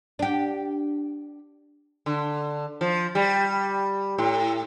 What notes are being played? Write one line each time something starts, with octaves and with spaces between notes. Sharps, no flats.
D4 G4
D3
F3
G3
A2